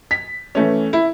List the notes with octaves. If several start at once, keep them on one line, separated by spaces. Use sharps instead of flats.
B6
E3 A3 C#4
E4